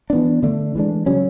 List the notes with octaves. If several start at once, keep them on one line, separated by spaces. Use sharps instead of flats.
E3 B3 D4
D3 A3 D4
E3 G#3 D4
C#3 F#3 C#4